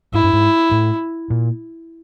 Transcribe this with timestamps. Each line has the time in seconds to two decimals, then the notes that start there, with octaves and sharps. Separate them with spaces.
0.14 G#2 E4
0.24 G2
0.33 G#2
0.71 A2
1.30 A#2